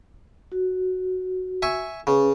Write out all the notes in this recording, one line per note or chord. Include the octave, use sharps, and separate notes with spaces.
F#4
E5 G#5 C#6
C#3 C#4 G#4 B4